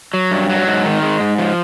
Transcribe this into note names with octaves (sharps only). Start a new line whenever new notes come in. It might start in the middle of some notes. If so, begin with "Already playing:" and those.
F#3
G2
F#3
G#2
D#3
G#3
G#2
F3